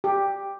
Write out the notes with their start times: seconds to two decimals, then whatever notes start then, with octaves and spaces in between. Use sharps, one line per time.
0.04 G4